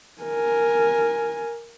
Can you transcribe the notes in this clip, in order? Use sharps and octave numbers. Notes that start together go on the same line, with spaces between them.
A#4 G#5